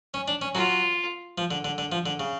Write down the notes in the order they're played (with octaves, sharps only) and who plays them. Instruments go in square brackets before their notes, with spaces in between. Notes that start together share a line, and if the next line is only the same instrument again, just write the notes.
[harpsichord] C#4
D4
C#4
[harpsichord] F#3 [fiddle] F4
[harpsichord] F3
D3
D3
D3
F3
D3
C#3